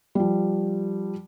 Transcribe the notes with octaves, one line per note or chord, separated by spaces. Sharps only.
F3 G3